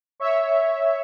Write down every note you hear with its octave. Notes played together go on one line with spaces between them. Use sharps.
C#5 E5